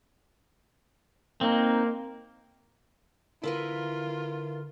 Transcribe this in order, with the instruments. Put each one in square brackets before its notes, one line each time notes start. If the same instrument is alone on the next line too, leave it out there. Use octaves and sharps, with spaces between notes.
[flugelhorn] A#3 [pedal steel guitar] C4 D#4
[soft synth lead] D3 [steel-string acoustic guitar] E4 A#4 B4 [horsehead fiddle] F4